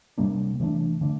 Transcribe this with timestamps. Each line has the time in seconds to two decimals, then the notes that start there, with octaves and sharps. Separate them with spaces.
0.18 C3 G3 A#3 D4
0.60 C3 E3 A3 D4
1.01 D3 A3 D4